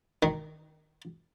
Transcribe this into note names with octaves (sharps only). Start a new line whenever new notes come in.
D#3